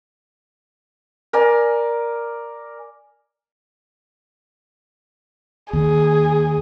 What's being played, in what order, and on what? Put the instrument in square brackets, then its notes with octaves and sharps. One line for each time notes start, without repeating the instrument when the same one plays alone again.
[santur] A#4 D5 G#5
[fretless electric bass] D#2 [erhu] G#4